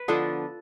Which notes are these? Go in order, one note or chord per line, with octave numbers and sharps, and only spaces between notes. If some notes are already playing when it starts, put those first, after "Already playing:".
Already playing: B4
D3 F3 B3 D4 A4